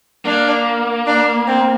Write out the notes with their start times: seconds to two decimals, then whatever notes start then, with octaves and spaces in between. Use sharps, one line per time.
0.25 A#3 D4
1.07 D4
1.47 C4